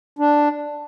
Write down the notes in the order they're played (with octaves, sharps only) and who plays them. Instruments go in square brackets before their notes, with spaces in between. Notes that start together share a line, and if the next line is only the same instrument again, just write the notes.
[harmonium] D4